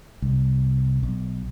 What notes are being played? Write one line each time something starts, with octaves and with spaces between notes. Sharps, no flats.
C2
B1